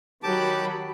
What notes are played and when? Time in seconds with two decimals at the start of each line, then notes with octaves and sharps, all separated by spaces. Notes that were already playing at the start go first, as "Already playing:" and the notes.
0.23 D#3 F#3 G4 A5 B5 D6